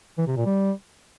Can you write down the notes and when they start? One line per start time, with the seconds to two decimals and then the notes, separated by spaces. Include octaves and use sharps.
0.18 E3
0.27 C3
0.37 A#2
0.46 G3